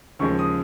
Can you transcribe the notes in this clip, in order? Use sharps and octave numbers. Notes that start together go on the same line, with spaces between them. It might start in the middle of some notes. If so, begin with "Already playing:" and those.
D#2 C#3 F3 G#3 C#6
D#6